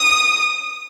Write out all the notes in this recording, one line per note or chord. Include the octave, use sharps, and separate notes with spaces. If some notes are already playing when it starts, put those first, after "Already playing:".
Already playing: D#6